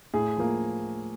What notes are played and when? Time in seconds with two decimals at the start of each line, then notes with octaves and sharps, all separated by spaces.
0.14 A2 G#4
0.37 F3 A#3